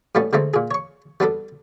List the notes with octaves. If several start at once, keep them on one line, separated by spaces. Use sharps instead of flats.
A2 G3 A3 B3 C#4
D3 G#3 A3 C4 D#4
A#2 G#4
C#5 C#6
G3 B3 D4 A4